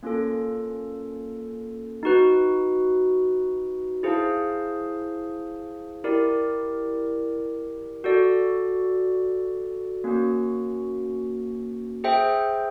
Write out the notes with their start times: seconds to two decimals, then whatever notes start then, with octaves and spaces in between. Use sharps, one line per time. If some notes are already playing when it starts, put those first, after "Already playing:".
0.03 A#3 C#4 F4 A4
2.03 D#4 F#4 B4
4.03 E4 G#4 C5 F5 A5
6.04 E4 G4 A#4 D5
8.04 F#4 A4 D5
10.04 A#3 C#4 F#4
12.04 G#4 C5 E5 G5